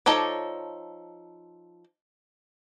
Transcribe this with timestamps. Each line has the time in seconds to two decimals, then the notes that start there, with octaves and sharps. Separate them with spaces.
0.06 F3 D#4 A4 C#5 D5